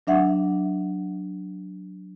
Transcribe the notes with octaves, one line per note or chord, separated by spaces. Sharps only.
F#3 D4 E5 F#5